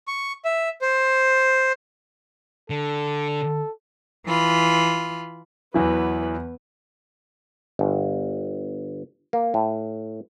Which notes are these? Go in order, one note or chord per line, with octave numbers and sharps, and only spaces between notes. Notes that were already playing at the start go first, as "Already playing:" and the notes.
C#6
E5
C5
D3 A4
E3 F4 B5
E2 E3 F#3 B3 B4
G1
A#3
A2